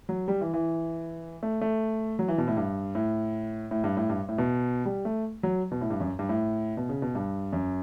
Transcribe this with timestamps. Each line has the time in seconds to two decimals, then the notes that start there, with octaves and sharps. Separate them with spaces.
0.09 F#3
0.28 G3
0.41 E3
0.54 E3
1.43 A3
1.61 A3
2.19 F#3
2.28 E3
2.38 B2
2.48 A2
2.57 G2
2.95 A2
3.71 A2
3.84 G2
3.97 A2
4.10 G2
4.29 A2
4.38 B2
4.85 G3
5.05 A3
5.43 F#3
5.71 B2
5.81 A2
5.91 G2
6.00 F#2
6.19 G2
6.29 A2
6.77 B2
6.89 C#3
7.02 B2
7.15 G2
7.53 F#2